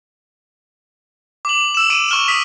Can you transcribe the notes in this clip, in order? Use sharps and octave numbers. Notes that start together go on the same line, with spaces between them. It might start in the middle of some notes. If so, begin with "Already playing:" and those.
D6 F#7
E6 E7
D6 D7 D#7
C#6 F6 E7
D#6 B6